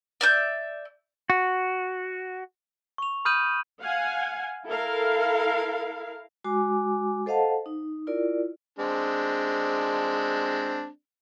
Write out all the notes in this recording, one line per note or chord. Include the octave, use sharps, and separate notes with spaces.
D5 E5 G6
F#4
C#6 F7
B5 D#6 F6 G6 D#7 F#7
F5 F#5 G#5
E4 A4 A#4 F5
G#3 F#4 G#5 D6
A4 C5 D#5 F5 F#5 A5
D#4
E4 F4 A#4 D5
G#3 C4 D4